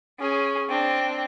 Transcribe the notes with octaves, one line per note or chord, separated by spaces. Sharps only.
C#4 G#4
C4 D4